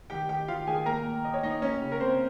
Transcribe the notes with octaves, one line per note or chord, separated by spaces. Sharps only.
D#3 G4 G5
D#3 G4 G5
D#3 F4 F5
D#3 G#4 G#5
A#3 A#4 A#5
A#2
A#2 D#5
C#5
A#2 D#4 D#5
A#3 C#4 C#5
C#3
A#4
A#3 C4 C5